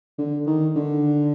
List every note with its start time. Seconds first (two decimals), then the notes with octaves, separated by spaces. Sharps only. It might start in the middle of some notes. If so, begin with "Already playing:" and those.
0.19 D3
0.47 D#3
0.76 D3